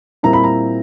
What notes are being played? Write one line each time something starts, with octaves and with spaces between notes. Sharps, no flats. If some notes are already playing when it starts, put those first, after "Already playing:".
A#2 G3 C4 E4 A#5
B5
A#5